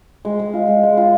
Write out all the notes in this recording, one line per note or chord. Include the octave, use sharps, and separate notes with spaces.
G#3
G#3
F4
G#3
G#3
F4